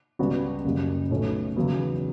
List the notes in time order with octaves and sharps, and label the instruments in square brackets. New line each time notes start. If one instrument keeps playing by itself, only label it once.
[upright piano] C#2 C#3 G3 B3 F#4
F#1 F#2 C#3 G3
B1 B2 A3 C#4
E2 C#3 F#3 B3